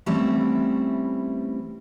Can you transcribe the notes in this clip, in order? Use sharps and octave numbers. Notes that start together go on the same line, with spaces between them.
E3 G3 A3 C4 C#4 E4